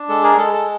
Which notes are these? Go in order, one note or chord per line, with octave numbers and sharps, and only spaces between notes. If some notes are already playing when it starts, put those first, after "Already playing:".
Already playing: D4
G#3 A4
G#4 A#4
G#3 A4
A4